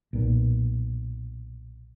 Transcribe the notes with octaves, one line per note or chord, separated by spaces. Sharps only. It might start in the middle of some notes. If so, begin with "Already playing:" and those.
B1 A#2